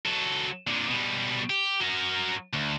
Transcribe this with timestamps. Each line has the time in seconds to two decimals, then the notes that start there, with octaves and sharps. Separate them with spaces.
0.06 F#3 A4
0.68 A#2 D3
0.89 B2 G3
1.50 G4
1.81 F#3 A#4
2.53 D2